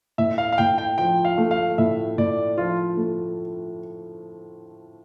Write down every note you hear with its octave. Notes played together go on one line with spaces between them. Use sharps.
A2 E5
F5
F5
A2 G5
G5
F3 G5
F5
A3
F5
A2 E5
A2 D5
F3 F4
A3